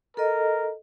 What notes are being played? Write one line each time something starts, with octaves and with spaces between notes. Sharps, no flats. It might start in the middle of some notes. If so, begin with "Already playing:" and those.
A4 A#4 D#5